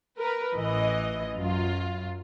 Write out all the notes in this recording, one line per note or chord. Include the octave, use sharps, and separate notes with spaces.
A#4 B4
A1 E3 D#5
F#2 F4